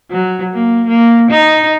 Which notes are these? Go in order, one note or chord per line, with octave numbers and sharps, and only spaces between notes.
F#3
A#3
A#3
D#4